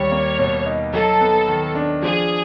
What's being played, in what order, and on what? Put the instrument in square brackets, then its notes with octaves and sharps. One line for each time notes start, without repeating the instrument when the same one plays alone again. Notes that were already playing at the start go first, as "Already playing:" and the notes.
Already playing: [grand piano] D#2 G3 [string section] C#5
[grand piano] A#3
B2
D#4
[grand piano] F#3 [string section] A4
[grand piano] B3
D#3
D4
[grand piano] F3 [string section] G#4